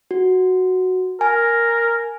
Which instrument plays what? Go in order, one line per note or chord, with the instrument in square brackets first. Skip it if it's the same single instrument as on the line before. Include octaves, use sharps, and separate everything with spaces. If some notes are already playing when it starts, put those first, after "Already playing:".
[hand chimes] F#4
[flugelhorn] A#4 [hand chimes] G#5